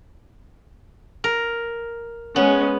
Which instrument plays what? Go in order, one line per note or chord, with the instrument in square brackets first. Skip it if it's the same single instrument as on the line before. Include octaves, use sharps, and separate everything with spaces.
[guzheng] A#4
[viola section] G#3 C#4 [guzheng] B3